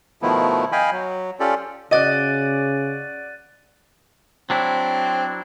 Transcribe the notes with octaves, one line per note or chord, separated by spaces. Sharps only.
B2 D#3 F3 A3 B3 E4
D#5 F5 G5 G#5 B5
F#3
C#4 F4 G4 A4 D5
C#3 F#4 D5 D#5 F#6 A6 D#7
F#3 C4 D4 E4